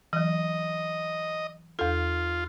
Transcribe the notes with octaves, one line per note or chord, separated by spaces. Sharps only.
E3 F#3 D#5
E2 F4 A4